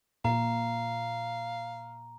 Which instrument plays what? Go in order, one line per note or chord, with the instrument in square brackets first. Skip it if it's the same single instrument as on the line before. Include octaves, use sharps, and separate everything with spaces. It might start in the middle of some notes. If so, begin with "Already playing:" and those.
[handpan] A#2 [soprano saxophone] F5 [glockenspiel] A#5